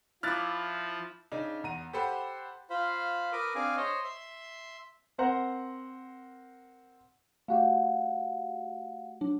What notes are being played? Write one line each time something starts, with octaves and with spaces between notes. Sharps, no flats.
F3 E4 D6 F6 F#6 A6
C#3 D4 D#4
E2 A#5 D#7
G4 A4 C5 F#5 B5
F4 C5 F5 B5
A#4 B4 D6 D#6
C4 D4 G#4 F5 G#5 D6
C5 C#5 D#5
E5 C6
C4 A#4 C5 F#5 A#5 C6
A3 F#4 G4 F5 F#5
F#3 D4